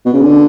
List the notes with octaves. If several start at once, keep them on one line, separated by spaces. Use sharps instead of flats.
B2
C#3
D3